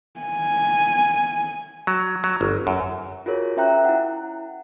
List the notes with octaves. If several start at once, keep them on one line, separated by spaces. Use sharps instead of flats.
G#5
F#3
F#3
G1
F#2
F4 F#4 G#4 A#4 C#5
C#4 C5 E5 G5 A#5 F#6
E4 F#5